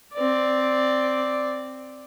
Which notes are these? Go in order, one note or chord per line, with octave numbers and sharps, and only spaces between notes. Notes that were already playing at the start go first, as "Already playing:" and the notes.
C4 D5